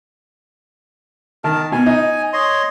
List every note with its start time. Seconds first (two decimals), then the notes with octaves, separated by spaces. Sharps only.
1.44 D#3 A#4 A5
1.72 B2 G#5
1.86 D#4
2.33 C#5 D#5 C6